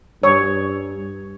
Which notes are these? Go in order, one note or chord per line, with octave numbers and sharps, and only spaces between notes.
G2 C#5